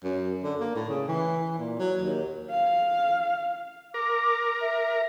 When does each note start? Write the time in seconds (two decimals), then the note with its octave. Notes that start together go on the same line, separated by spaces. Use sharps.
0.04 F#2
0.44 D3
0.60 A#3
0.75 A2
0.89 C#3
1.08 E3
1.59 A#2
1.79 F#3
2.01 D#2
2.50 F5
3.94 A#4 D6
4.23 D6
4.61 E5